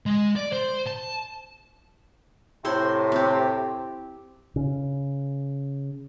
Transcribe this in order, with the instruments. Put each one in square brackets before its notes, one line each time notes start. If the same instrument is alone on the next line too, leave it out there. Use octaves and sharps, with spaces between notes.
[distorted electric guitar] G#3
D5
C5
A5
[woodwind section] A2 C3 [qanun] E4 C5 C6
[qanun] C4 G4
[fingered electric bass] C#3